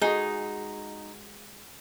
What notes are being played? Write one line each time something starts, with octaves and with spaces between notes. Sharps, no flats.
G#3 D#4 F#4 G#4